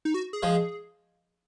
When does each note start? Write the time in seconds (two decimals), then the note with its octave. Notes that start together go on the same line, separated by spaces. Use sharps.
0.05 D#4
0.14 F#4
0.33 G#4
0.43 F3 G#3